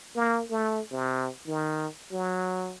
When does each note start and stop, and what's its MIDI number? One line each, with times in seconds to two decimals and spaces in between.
0.15 0.43 58
0.50 0.81 57
0.91 1.29 48
1.47 1.87 51
2.12 2.74 54